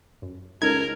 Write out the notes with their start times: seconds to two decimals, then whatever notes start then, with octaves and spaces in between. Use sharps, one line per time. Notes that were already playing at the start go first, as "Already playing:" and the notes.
0.22 F#2
0.62 C#2 D#4 A4 A#4 G#6